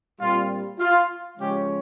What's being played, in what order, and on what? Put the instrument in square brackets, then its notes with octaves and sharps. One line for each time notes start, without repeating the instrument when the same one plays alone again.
[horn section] A#2 G3 C4 F4
F4
C#3 F3 G#3 C#4 G4